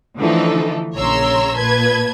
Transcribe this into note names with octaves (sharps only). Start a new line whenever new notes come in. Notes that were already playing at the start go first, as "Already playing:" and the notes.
D3 E3 F3 A3 D#4 A4
A#1 C#3 C#5 A#5 C6 E6
A#2 B4 A5 G#6